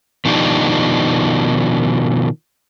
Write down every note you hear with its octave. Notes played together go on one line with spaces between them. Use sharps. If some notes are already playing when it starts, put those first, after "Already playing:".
B2 D#3 F3 D4 D#4 G4